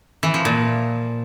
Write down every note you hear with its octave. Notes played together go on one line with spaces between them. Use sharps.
E3
F3
A#2